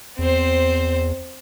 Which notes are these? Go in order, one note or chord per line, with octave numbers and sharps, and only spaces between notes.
E2 C4 C5